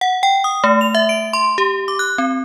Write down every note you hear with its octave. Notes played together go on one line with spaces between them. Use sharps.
F#5
G5
D#6
A3
F7
E5
D7
C6
G4
D6
F#6
C4